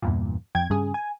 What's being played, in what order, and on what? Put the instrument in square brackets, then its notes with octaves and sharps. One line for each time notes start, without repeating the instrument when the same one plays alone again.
[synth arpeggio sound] E2 G2 A#2
F2 G5 G#6
G2 C#3 G#4
G#5